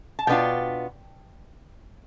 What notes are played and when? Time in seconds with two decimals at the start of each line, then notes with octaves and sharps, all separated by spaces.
0.19 A5
0.27 B2 B3 D4 F4 G5